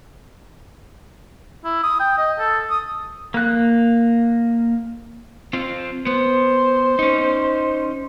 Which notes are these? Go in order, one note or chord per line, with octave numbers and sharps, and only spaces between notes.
E4
D#6
G5
D#5
A4
D#6
A#3 F#6
C4 F4
B3 C5
C#4 D#4